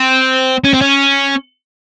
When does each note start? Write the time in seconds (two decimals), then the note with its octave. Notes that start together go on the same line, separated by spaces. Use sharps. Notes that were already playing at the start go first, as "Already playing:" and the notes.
Already playing: C4
0.64 C#4
0.73 C4
0.81 C#4